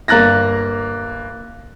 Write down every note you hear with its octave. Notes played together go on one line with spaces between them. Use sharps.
G1 A#3 A#5 F#6 A6 A#6